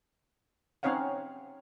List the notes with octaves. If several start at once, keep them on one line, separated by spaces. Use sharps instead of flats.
C4 C#4 D#4 C#5 F5 F#5